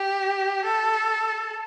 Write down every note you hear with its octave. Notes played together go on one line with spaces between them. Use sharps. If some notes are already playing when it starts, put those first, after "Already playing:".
Already playing: G4
A4